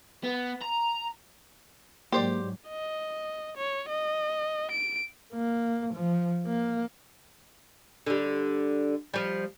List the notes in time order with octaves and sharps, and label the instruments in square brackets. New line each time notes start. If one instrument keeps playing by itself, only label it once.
[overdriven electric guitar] B3
A#5
[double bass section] G#2 F#3 [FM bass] A#3 [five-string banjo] G4 C5 D5
[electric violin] D#5
C#5
D#5
D7
[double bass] A#3
F3
A#3
[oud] D3 G3
F3 G3